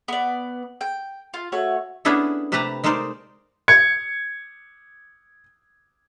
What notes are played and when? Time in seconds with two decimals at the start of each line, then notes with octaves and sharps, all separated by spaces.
0.08 B3 D5
0.81 G5
1.34 F4
1.52 A3 F#4 C#5
2.05 B3 C#4 D4 E4 G#4 A4
2.52 C3 A3 G4 B4 A5 A#5
2.84 G#3 A3 D#4 A#4 C5 D5
3.68 G#6 C#7